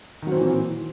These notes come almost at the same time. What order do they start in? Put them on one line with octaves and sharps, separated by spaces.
D#3 F#3 C4 E3 A#2